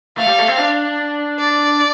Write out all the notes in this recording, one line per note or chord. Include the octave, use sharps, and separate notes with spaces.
A3 F5
G3
A3
C4
D4
D5